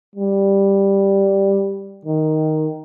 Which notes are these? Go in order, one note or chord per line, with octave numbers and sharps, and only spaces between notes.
G3
D#3